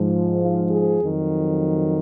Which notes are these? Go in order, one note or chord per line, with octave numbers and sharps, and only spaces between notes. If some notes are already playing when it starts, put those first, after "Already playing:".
Already playing: G#2 F3
F4
G#4
F2 D#3 F#3